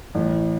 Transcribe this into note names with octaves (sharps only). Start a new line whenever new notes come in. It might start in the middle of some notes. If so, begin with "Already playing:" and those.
A1